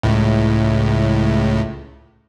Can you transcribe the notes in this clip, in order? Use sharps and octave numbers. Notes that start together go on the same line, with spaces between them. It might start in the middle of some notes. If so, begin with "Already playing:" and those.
C#2 A2